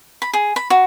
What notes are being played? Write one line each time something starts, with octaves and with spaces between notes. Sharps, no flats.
B5
G#4
B5
F#4